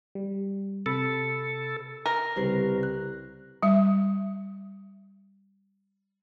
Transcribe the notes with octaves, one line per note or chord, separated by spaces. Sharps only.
G3
C3 A4 B5
A#4
C2 C#3 G3 G4 B4 C5
F#6
G3 E5